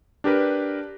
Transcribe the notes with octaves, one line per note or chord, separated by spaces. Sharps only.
D4 G4 A#4 B4